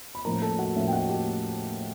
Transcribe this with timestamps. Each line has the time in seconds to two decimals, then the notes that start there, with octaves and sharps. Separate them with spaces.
0.15 B5
0.25 A2 F3 A#3 C#4 A#4 A#5
0.42 A4 A5
0.59 F#4 F#5
0.76 A2 F3 A#3 C#4 E5
0.88 G5
0.93 F#4 F#5
1.10 G4 G5